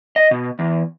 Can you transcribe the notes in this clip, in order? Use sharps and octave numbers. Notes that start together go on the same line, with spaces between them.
D#5
B2
E2